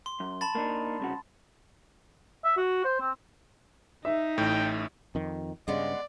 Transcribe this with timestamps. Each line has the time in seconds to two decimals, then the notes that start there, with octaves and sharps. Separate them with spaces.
0.06 C6
0.20 F#2
0.41 A5 B5 A6
0.55 A#3 D4 D#4
1.00 C2 C#3 F#4
2.44 E5
2.57 F#4
2.84 C5
3.00 C4
4.05 D#4 E5
4.38 A1 A2 G5
5.15 F2 D#3
5.68 G2 C#3 G#3 B3 D5